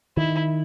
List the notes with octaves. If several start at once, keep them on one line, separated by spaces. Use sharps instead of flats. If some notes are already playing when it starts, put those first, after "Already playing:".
D#3 E4